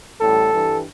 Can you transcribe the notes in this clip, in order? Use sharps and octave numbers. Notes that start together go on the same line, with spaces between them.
A1 A2 G3 A4
G2 E3 G3